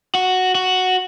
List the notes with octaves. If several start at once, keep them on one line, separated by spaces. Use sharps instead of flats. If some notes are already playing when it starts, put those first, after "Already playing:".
F#4
F#4